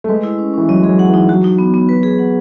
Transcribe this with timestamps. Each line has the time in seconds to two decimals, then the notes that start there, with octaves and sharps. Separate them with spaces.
0.04 A3
0.08 G#3 B4
0.23 E4
0.38 C#4
0.54 E3 C#4
0.69 F#3 D#5
0.83 G#3 G#4
0.89 F#3
0.99 F#5
1.09 E3
1.14 D#4
1.29 F#3 F#4
1.44 D#4
1.59 B3
1.74 B3
1.89 B4
2.03 G#4
2.19 F#5